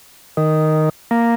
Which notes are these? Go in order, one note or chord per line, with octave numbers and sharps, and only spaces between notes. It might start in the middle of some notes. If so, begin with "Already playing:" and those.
D#3
A#3